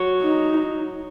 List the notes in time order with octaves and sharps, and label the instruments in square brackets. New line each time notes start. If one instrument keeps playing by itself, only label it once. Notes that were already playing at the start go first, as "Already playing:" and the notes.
Already playing: [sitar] F#3
[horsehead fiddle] D#4